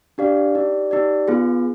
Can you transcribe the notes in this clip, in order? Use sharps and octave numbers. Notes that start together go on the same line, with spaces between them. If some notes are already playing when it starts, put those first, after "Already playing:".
D4 G4 D5 F5
D#4 G4 D5
D#4 G4 D5
B3 F4 G#4